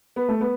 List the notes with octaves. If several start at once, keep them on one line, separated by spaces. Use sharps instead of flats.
B3
A3
B3